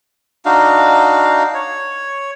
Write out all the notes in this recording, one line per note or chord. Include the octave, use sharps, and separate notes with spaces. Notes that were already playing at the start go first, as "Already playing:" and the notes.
D4 D#4 F#4 F5
C#5